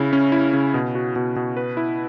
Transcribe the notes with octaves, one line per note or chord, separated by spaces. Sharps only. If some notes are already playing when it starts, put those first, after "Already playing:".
Already playing: C#3 E4
C#4
E4
C#3
B2
F#4
B2
B2
B4
E4